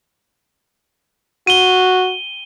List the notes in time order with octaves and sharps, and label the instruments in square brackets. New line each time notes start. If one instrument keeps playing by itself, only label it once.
[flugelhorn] F#4 [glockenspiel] D#7 G7